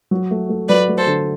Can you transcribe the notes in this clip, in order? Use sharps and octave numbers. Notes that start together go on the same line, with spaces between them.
F#3
A3
A3
F#3 B4 D5
A3
A4 C5
D3